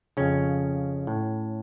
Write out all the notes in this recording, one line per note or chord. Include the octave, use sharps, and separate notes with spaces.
F2 C#3 C#4
A2